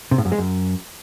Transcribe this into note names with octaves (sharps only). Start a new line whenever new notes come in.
C3
A2
F#2
G#3
F#2